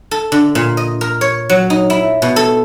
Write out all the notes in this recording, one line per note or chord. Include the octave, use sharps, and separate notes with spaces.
A4
D3
A#2
D#5
A#4
C#5
F#3
D#4
E4
B2
A4